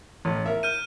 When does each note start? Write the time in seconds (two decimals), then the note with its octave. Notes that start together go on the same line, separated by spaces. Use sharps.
0.25 A1
0.46 A#4 E5
0.63 F6 G6 D#7